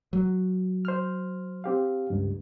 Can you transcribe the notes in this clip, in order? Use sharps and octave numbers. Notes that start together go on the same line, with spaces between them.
F#3
C5 F6
C4 G4 F5
C#2 G2